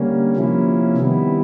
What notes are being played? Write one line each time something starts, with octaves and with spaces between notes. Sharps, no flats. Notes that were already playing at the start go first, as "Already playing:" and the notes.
Already playing: D3 G3 A#3 C#4
C3 F3 A#3 C#4 E4
C3 D#3 G3 B3 E4